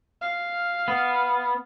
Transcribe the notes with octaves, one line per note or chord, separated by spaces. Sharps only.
F5
B3